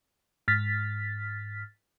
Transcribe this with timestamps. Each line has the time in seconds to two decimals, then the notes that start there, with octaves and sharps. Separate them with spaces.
0.48 G#2 F6 A6 B6